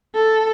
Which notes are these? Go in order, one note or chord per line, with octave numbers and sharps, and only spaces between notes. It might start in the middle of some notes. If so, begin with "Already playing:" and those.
A4